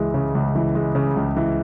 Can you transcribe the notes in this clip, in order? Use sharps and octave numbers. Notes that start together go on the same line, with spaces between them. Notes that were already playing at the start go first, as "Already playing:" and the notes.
Already playing: C#2 E3 G#3
C#3
C#2
E3
G#3
C#3
C#2
E3